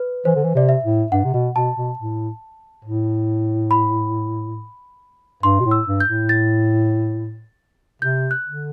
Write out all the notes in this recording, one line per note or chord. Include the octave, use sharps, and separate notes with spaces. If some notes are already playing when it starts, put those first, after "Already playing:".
Already playing: B4
E3 C5
D3
E3
C3 D5
E5
A2
G2 F#5
C3
B2
B2 A5
B2
A2
A2
B5
G2 C6
B2
A2
E6
G2
G6
A2
A6
C3 G6
F#6
D3